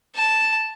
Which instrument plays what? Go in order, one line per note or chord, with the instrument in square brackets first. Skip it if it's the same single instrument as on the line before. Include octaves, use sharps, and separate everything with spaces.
[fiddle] A5